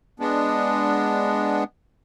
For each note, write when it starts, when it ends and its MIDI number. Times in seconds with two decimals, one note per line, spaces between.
0.20 1.64 56
0.20 1.64 59
0.20 1.64 62